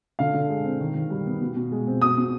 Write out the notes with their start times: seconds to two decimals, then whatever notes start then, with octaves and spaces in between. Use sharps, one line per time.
0.19 D3 F5
0.34 D3
0.50 G#3
0.64 C4
0.81 D#3
0.95 D#3
1.10 G3
1.26 B3
1.42 B2
1.56 B2
1.72 G#3
1.87 C4
2.01 B2 D#6
2.18 B2